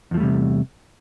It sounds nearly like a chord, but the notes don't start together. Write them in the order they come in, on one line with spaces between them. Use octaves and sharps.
E2 F3 A3 G3 C3